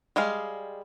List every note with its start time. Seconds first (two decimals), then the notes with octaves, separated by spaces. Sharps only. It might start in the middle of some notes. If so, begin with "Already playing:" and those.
0.16 G3 G#3 G#4 F5